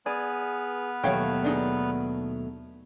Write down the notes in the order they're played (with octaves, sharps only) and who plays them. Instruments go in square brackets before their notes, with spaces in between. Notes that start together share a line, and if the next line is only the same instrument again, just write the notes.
[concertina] B3 B4 F6 [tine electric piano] G#4 G#5 [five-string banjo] D5
[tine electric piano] D#2 A3 G#6 [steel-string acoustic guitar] B2 F#3 [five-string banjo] C#5 F5 G5
[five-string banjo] D4 D#4 G#4